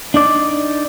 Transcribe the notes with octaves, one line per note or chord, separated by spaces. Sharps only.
D4 D#4 D5